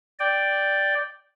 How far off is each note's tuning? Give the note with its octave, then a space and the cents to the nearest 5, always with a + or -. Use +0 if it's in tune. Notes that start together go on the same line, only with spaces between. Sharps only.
D5 +0 G5 +0